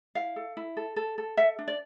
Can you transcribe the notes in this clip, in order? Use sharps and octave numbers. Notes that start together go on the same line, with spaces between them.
E4 F5
A4
E4
A4
A4
A4
A4 E5
D4
D5